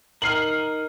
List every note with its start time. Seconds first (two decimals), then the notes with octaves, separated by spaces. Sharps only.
0.22 D#4 A#4 F6 C7 F#7